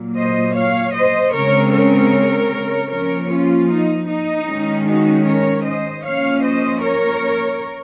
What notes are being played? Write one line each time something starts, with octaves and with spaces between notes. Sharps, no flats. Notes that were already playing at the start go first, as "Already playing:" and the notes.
Already playing: A#2 F#3 A#3
C5 D#5
C#5 F5
C5 D#5
C#3 G#3 C4 A#4 C#5
A#4 C#5
F3 A#3 C#4 A#4 C#5
C#4 F4
D#4
D#4
D#3 G#3 C#4
D#4 F#4
A#4 C#5
C5 D#5
F3 A#3 C#4 C#5 F5
C5 D#5
A#4 C#5